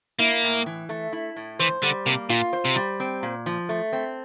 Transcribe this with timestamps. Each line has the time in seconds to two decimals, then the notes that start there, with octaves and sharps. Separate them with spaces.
0.19 A#3 E4
0.43 A2
0.66 E3
0.89 A3
1.13 E4
1.36 A2
1.59 E3 C5
1.83 D3 G3
2.06 C3 A#3
2.30 A#2 F4
2.53 C5
2.65 C3
2.76 G3
3.00 C4
3.23 A#2
3.46 F3
3.69 A3
3.93 C4